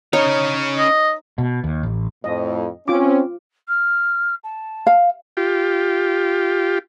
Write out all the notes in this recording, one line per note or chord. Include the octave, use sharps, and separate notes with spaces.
C#4 D#4 C#5 F5
D#5
B2
D#2
A1
F2 A2 D#5
C4 C#4 F4 D6
F6
A5
F5
F4 G4